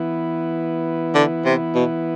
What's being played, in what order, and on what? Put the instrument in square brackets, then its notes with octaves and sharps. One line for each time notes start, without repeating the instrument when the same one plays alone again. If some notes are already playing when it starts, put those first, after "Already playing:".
Already playing: [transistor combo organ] E3 B3 E4
[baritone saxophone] D3
C3
B2